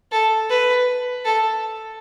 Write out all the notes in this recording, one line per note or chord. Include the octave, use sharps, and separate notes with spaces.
A4
B4
A4